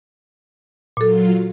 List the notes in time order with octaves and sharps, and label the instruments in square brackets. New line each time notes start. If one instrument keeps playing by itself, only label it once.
[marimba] A#2 A4 [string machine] F#3 F4